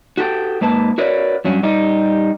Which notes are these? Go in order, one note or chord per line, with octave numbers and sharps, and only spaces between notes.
F#4 G4 A4 G5
G#2 A#3 B4 A5
F#4 A#4 B4 C#5 D5
G2 F#3 C#4
G3 D#4 G4